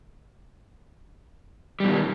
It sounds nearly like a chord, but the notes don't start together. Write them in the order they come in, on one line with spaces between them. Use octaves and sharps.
G3 B2 D#3